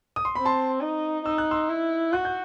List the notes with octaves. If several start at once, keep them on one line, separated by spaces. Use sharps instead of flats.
D#6
C6
C4 B5
A5 C6
D#4
D#4 E6
F#6
C6 E6
E4
F#4 F#6
G6